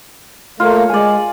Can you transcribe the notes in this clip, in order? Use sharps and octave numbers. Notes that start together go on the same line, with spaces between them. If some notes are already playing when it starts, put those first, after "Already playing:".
A3 A#3 F4 C#5
G#3 D5 G#5